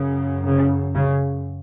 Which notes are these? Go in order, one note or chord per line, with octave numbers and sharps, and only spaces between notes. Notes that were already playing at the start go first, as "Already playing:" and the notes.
Already playing: F#2 C#3
C#3
C#3